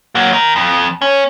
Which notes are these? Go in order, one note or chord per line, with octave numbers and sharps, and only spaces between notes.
F#3 A#3
D#4 A#4
F2
C#4